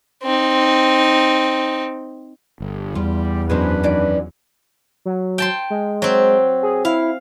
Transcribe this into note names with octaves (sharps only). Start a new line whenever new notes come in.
C4 D#4
G1
E2 G3 F4
F#2 G#3 B3 C4 D4 B4
D#3 E3 D5
F#3
G5 A5 C6
G#3
F#3 C4
G#4
E4 F5